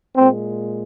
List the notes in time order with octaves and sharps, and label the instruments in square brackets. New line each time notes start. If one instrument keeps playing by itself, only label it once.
[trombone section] A#2 G#3 C4